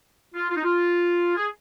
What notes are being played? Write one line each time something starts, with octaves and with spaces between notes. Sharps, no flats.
F4
F4
D#4
F4
G#4